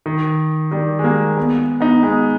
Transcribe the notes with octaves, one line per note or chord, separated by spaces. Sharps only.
D#3
D#3 G3
G#3
G3 A#3
G#3 B3
B3 D#4
G#3 B3